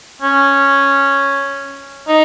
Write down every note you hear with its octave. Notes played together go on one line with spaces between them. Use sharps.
C#4
D#4